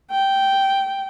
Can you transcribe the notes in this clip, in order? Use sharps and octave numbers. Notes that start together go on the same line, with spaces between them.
G5